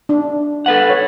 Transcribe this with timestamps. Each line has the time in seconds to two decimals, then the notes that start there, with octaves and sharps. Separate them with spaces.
0.09 D4
0.66 A4 B4 F#5
0.90 C#5